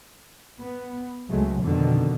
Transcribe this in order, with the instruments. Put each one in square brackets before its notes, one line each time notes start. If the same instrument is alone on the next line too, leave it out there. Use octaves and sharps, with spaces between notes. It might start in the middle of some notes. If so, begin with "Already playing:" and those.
[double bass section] B3
C#2 F#3 G#3 A3
F2 B2 D3 D#3